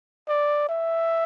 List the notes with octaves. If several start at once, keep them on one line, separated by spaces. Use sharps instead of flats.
D5
E5